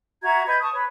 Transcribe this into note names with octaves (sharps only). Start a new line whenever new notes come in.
F#4 E5 A#5 G#6
B4 D#5 G6 G#6
A5 C#6 D#6
B4 C#5